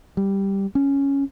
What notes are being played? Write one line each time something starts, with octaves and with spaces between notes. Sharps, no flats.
G3
C#4